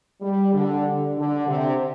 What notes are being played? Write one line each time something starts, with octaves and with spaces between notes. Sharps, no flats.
G3
D3
D3
C3